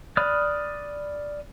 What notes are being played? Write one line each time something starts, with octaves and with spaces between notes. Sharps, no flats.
D5 B5 D#6 F6 F#6